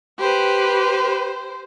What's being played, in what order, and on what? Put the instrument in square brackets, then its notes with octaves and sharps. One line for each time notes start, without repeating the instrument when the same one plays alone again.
[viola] G4 B4 [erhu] C5